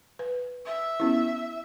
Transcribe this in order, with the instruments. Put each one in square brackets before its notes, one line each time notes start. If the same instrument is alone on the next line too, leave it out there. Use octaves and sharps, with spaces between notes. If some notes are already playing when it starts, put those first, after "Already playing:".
[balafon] B4
[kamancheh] E5
[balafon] B3 C#4 E4